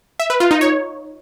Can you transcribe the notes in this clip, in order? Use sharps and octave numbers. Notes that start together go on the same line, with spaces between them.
E5
B4
F4
D#4
C#5